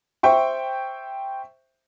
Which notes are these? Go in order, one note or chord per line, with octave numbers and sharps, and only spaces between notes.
C5 E5 G5 C#6